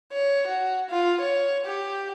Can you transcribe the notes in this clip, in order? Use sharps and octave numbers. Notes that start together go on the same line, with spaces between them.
C#5
F#4
F4
C#5
G4